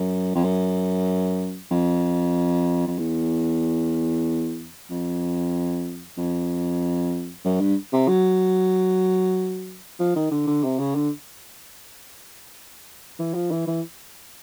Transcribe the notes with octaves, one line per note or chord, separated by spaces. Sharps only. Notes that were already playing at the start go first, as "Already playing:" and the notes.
Already playing: F#2
F2
F#2
F2
F2
E2
F2
F2
F#2
G2
C3
F#3
F3
D#3
D3
D3
C3
C#3
D3
E3
F3
E3
E3